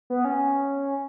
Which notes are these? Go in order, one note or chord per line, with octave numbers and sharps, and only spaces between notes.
B3
C#4